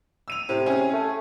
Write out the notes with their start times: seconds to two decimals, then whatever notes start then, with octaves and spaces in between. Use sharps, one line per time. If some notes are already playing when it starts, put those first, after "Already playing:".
0.28 E6 D#7 F7
0.49 A2 C3
0.66 C#4 G#4
0.93 A3